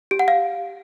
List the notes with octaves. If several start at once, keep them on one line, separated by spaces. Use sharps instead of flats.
G4
F#5
F5